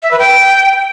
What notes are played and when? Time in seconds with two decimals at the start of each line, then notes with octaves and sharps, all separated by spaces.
0.03 E5
0.11 B4
0.19 G5